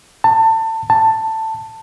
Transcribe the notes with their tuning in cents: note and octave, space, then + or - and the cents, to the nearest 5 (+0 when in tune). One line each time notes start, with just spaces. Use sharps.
A5 +25
A5 +10